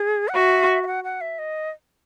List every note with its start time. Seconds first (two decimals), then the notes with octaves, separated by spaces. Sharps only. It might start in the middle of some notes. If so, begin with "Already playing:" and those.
Already playing: G#4
0.29 F#5
0.36 F#4 E5
0.83 E5
0.87 F#5
1.04 F#5
1.21 E5
1.39 D#5